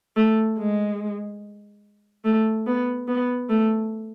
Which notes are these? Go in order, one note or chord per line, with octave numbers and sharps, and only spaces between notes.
A3
G#3
A3
B3
B3
A3